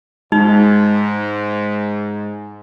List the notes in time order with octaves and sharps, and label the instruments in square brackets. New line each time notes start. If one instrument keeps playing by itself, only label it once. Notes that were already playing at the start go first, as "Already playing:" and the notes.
[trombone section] G#2 [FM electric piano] G#3 [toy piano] D#4